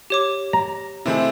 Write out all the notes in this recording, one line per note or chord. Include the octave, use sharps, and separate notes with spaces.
G4 C#5 D6
A#5
C3 G#3 A3 C4 E4